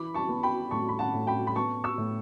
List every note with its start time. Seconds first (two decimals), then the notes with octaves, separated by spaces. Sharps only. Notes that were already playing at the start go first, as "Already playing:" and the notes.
Already playing: E3 B5 D6
0.14 A5 C#6
0.29 B3
0.43 G5 B5
0.71 A2 A5 C#6
0.89 B5
0.99 F#5 A5
1.14 A2
1.27 G5 B5
1.47 B5
1.55 B3 A5 C#6
1.84 C#6 E6
1.98 A2